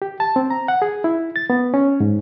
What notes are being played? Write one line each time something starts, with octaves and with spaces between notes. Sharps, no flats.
G4
A5
C4
A#5
F#5
G#4
E4
A6
B3
C#4
G#2